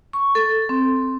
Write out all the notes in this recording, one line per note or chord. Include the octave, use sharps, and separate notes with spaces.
C#6
A4
C4